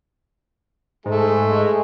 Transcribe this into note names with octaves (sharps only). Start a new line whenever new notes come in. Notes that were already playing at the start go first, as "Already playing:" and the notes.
G#2 G#3 A3 G#4
G#3